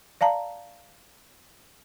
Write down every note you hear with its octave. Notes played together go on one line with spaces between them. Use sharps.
D5 F5 A5 A#5